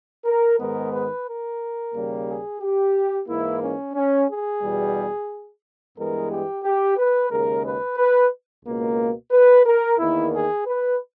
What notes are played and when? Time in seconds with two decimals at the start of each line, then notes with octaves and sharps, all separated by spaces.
0.25 A#4
0.59 G#2 D#3 G#3 B3 A#4
0.93 B4
1.26 A#4
1.93 D#2 C#3 G3 A#3
2.27 G#4
2.60 G4
3.27 G#2 E3 A#3 E4
3.60 C#4
3.94 C#4
4.28 G#4
4.62 E2 B2 G3
5.96 G2 E3 G#3 B3 A#4
6.30 G4
6.64 G4
6.97 B4
7.30 D#2 C#3 G#3 A#4
7.64 B4
7.97 B4
8.64 C#2 B2 A#3
9.31 B4
9.65 A#4
9.98 E2 D#3 A#3 E4
10.32 G#4
10.66 B4